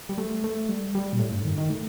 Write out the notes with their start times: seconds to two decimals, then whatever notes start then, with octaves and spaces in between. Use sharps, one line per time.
0.09 G3
0.18 A3
0.44 A3
0.69 G3
0.95 G3
1.13 A#2
1.19 A2
1.32 G2
1.45 D#3
1.58 D#3
1.70 A3